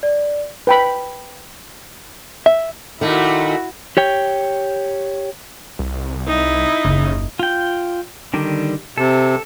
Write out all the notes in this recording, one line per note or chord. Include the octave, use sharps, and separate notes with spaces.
D5
B4 G5 B5
E5
A#2 D#3 A3 E4 F#4
G4 C#5 G5
C2
D#4 E4
F#1 D#2 C#3
F4 G5
D3 D#3 G3
C3 A4